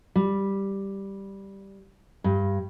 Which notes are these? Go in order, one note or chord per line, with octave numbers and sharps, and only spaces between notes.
G3
G2